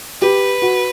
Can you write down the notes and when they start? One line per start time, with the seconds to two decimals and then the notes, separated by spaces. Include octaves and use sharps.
0.21 G4 B4
0.62 F#4